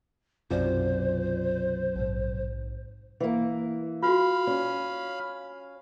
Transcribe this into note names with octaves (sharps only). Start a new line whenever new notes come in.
B1 F#2 C3 F4 C5 D5
A#1 G#2
E3 A#3
F4 F#4 F5 B5
C#4